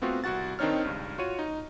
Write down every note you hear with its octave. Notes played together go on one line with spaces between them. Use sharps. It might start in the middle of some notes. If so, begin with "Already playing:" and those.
A3 B3 C4 F4 F#4
C2 F#4 F#5 A6
D#3 C4 D4 D#4 C#5 F6
C#2 G2
F4 F#4 C#5 D#7
D#4